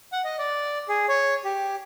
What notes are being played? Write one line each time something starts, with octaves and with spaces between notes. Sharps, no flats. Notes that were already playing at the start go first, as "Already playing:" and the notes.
F#5
D#5
D5
G#4
C#5
G4